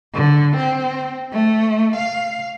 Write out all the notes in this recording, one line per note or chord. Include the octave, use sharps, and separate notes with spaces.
D3
C4
A3
F5